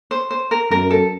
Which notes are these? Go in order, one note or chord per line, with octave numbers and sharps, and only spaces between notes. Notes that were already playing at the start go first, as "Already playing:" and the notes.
C5
C5
A#4
F#2 A#4
A4